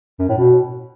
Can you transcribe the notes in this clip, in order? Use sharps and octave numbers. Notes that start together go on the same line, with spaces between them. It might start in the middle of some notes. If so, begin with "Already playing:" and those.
F#2
A2
B2